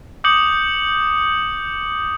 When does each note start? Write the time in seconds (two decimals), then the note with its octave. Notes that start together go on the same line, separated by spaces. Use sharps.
0.24 D6 D#6 G6 C#7 F#7